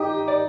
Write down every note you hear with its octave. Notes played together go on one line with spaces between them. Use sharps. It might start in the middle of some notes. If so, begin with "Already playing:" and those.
Already playing: D#4 G4 D#5
D5